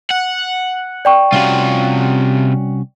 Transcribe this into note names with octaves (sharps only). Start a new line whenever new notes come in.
F#5
D5 G5 C#6
C2 C3 C#4 F4 F#4